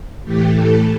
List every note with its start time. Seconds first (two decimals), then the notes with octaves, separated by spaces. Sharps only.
0.24 A2 E3 A3 G4
0.54 A4